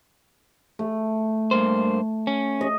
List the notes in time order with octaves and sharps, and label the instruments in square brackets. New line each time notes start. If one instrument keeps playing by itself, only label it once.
[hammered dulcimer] A3
[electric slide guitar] G2 A#3 C5
C#4
[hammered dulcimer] D#5